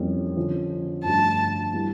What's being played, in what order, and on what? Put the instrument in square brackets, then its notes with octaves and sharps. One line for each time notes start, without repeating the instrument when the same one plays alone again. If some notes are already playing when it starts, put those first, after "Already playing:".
Already playing: [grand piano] F2 E3 G3 A#3 C#4
D3 F3 C#4
[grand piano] G2 F3 A3 D4 F4 [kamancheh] A5
[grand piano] E3 G3 A#3 E4 G4